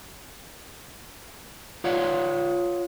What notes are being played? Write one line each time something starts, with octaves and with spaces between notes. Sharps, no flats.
F4 C#5 D5 F5 F#5